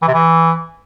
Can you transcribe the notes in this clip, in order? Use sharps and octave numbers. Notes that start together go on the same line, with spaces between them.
E3
C3
E3